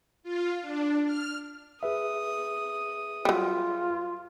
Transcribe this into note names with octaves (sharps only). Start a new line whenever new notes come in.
F4
D4
F6
G#4 B4 E5 D#6
F#3 G3 F4